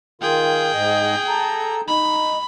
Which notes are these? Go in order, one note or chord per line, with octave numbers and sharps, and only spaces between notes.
D#3 F4 G#4 G5
G#2 D#5
A4 A#5
D#4 B5